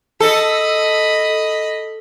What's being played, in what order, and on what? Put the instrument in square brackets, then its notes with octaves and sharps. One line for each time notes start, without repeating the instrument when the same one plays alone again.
[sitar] A4 [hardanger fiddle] D#5 B5